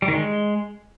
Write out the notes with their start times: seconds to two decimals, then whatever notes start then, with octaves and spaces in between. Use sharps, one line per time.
0.02 G3
0.08 D#3
0.14 G#3